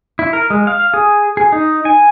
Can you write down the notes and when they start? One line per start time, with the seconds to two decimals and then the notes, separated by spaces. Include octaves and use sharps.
0.19 E4
0.33 A#4
0.50 G#3
0.67 F5
0.94 G#4
1.37 G#4
1.53 D#4
1.85 G#5